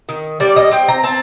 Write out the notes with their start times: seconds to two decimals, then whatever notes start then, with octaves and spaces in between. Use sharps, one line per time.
0.09 D#3
0.40 G3 D5
0.56 D#5
0.71 C4 G5
0.89 A#5
1.04 C4 A5